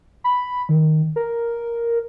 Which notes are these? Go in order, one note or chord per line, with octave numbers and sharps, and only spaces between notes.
B5
D#3
A#4